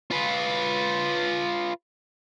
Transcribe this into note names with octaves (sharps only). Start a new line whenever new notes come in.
F4 B4